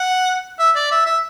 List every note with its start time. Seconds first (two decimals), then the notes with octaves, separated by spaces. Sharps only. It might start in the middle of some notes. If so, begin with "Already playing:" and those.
Already playing: F#5
0.59 E5
0.76 D5
0.91 E5
1.06 E5